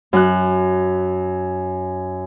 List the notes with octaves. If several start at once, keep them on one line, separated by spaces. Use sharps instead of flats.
F#2 F#6